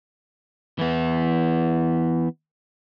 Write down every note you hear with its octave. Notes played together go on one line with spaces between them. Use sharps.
E3 B3